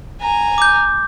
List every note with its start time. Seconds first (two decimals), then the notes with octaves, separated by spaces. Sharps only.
0.21 G#5 A#5
0.58 D6 G6